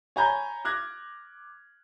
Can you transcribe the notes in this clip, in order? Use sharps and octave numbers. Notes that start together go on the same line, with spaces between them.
C#5 G#5 A#5 B5 G6 G#6
D6 F6 F#6 G#6 A#6